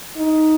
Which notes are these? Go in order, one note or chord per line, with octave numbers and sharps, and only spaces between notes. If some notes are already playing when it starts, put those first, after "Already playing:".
D#4